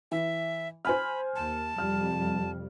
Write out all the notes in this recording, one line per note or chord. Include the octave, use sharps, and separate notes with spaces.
E3 E5
C5 G#5 B5 F6
D#2 A5
F2 C3 G3 F6